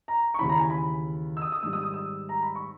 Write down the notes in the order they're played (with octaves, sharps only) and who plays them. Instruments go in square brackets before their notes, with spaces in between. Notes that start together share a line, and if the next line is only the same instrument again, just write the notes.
[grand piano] A#5
C#6
D#2 C#3 E3 B5
A#5
G#5
B5
E6
D#6
D#6
G#2 D#3 G3 E6
D#6
D#6
E6
A#5
B5
C#6